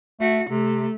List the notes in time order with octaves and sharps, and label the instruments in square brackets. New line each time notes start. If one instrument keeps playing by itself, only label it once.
[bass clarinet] A3 [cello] F#4
[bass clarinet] C3 [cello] A3